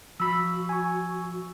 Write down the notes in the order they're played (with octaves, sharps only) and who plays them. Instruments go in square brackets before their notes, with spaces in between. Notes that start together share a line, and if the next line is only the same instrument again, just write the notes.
[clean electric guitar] F3 B5 [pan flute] F#4 [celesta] E6
[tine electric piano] G#5 C#6